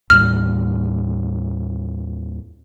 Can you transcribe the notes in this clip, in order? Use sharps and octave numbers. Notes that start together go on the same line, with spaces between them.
D#2 A2 G3 F6